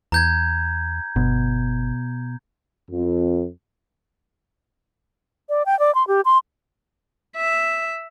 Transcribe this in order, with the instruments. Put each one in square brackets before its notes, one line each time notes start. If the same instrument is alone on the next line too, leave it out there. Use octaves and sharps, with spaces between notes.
[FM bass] E2 [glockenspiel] A#5 G6 G#6
[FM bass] G1 [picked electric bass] B2
[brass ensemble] F2
[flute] D5
G5
D5
C6
G4
C6
[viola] E5